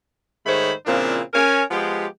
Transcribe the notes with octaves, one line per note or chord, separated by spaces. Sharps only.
G#2 D#3 A3 C5 C#5 B5
A#2 C#3 F3 C4 D4 E4
C#4 A#4 G#5
F3 G#3 B3 G4